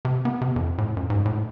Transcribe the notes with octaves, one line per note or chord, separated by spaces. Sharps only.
C3
B3
C3
F2
A2
F#2
G#2
A2